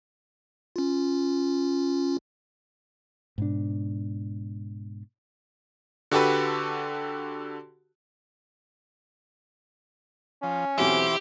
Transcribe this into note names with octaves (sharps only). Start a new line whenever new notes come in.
C#4 F4
G#2 B2 D4
D3 F#4 G4 A4 B4
F3 C#4
B1 E3 C4 E4 F#4 G4 C5